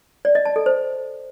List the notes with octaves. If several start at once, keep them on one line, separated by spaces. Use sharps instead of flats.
D5
D#5
A5
A4
C5